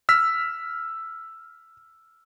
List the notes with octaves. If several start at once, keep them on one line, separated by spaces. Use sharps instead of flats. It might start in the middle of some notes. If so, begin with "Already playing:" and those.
E6 F6 B6